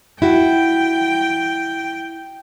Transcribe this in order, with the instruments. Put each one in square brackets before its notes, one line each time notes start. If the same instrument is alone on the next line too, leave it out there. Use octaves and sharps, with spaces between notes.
[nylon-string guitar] E4 F#4 [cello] G5